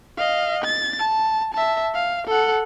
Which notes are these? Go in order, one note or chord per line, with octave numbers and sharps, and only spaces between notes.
D#5 F5
A6
A5
E5 A5
F5
A4 F#5